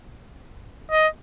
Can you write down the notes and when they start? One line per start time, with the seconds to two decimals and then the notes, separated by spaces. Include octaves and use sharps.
0.91 D#5